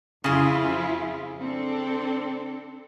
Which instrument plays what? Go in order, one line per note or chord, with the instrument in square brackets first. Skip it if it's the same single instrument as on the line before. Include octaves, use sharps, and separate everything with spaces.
[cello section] F2 E4 F4 [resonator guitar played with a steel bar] C#3 G#4
[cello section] C4 D4 A4